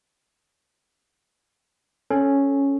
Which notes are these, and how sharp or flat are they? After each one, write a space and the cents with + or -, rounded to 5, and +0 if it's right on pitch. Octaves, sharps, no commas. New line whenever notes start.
C#4 +0 A4 -15